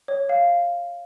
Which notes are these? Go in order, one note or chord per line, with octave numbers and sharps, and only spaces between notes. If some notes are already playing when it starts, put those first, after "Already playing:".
C#5
F5